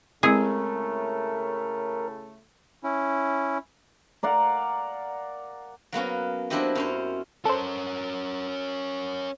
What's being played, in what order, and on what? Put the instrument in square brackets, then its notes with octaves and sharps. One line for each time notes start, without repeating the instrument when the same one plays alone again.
[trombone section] A2 C#3 A3 [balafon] G#3 C4 E4 [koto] G#4 [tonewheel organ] A#4
[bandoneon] C#4 E4
[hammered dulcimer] A#4 D5 F5 F#5
[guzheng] F#3 A#3 B3 C#4
F#3 C4 D4 E4 G4 D#5
F#2 C#4 C5
[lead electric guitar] C#4 A#4 [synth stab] A4 C5